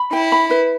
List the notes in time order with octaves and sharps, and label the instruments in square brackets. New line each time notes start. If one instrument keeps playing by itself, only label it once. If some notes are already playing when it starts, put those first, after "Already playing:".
Already playing: [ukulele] B5
[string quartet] E4 [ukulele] G5
[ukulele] B5
B4